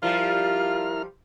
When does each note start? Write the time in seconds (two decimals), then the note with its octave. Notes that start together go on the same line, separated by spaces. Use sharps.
0.03 F3 G3 E4 F4 A#4 F6